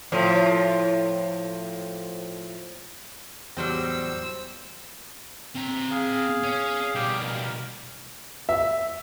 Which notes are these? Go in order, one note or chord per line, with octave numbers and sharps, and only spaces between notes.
A2 F3
E2 A2 F#3 G3 C5 G5 E6 A#6
C4 A#5
G#4 F5
C#4
B2 G3 G4 F5 G5
A#4
E5